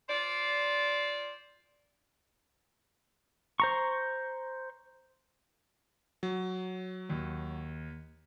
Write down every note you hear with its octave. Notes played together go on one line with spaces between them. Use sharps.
F4 C5 D5
C5 A#5 C#6
F#3
D#2